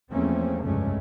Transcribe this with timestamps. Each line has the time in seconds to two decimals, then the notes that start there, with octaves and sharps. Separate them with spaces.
0.12 E2 F3 A3 A#3 C4 C#4
0.65 F1 C#2 G2 G#3 A3 C#4